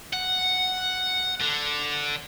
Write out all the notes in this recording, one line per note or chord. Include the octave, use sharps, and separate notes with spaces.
F#5
D3